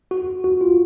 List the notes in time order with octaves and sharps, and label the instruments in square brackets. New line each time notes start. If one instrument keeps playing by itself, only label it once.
[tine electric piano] F#4
F#4
F4